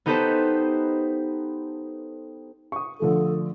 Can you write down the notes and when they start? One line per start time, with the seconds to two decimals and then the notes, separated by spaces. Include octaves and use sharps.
0.06 B3 D#4 G4 A4 B4 C5
2.72 C#6 D#6
3.00 D3 F3 A3 A4